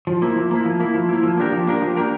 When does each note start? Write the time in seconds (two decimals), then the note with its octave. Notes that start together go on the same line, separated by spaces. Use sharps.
0.07 F3
0.22 A#3 E4
0.36 F3
0.51 A#3 E4
0.66 F3
0.80 A#3 E4
0.94 F3
1.09 A#3 E4
1.23 F3
1.38 A#3 D4 G4 A#4
1.52 F3
1.67 A#3 D4 G4 A#4
1.82 F3
1.97 A#3 D4 G4 A#4